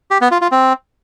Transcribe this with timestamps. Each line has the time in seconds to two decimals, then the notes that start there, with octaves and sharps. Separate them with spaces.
0.11 G4
0.21 B3
0.31 F4
0.41 F4
0.52 C4